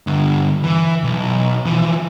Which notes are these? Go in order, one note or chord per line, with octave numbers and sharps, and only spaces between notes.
G2 D3
E3
B1
E3 F3